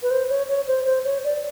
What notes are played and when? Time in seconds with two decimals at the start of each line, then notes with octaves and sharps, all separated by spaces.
0.02 B4
0.10 C5
0.29 C#5
0.48 C#5
0.66 C5
0.85 C5
1.04 C#5
1.24 D5